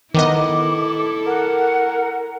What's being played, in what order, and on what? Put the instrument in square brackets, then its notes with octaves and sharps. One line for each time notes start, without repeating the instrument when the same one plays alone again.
[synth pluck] D#3 B3 D#5 [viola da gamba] E4 A4 [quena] D6
[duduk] A#4 [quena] F#5